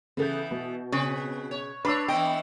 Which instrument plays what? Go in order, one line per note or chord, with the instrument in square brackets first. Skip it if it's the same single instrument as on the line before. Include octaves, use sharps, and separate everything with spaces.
[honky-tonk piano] C#3 A4 G6 [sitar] E3 B3
[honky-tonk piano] B2
[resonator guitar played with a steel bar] C#3 [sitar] C4 B4
[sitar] C#5
[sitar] D4 C#5 [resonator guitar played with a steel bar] B4 [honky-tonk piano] B5 D6 E6
[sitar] E3 B3 D#5 [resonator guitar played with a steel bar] G5